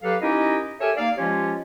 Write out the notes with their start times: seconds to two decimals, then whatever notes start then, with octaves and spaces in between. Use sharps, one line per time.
0.03 F#3 G4 A4 B4 F5
0.21 C#4 D#4 E4 G4 A#4 D#5
0.80 G4 A4 A#4 C#5 E5 G#5
0.97 A#3 D#4 D5 F5
1.18 F3 G#3 C#4 F4 G4 C#5